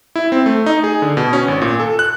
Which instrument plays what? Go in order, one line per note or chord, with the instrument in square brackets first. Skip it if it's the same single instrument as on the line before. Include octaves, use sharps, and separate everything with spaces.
[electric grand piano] E4
C4
A3
D#4
G#4
D3
B2
C#4
G#1
A#2
A4
F#6